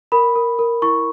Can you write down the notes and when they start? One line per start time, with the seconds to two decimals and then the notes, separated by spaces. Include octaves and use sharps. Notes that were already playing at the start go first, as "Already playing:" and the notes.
0.12 A#4 B5
0.36 A#4
0.59 A#4
0.82 E4 C#6